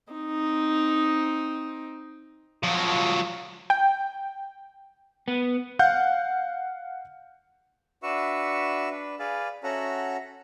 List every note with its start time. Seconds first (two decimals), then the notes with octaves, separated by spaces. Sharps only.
0.12 C4 D#4
2.63 F3 F#3
3.70 G5
5.28 B3
5.79 F5 F#5 G6
8.03 D4 F#4 B4 E5 C#6 E6
8.90 D4 B4
9.19 G#4 B4 D5 F5
9.63 C#4 F#4 A4 E5 F#5 A#5